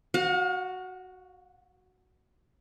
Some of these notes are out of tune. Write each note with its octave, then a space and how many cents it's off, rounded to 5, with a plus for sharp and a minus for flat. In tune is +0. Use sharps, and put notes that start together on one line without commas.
F#4 +0 F5 +40